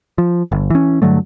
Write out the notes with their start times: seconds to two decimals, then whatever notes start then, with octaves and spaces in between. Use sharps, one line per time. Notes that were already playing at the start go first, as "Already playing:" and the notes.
0.18 F3
0.52 G1
0.70 E3 C#4
1.02 G2 D3 F#3 A3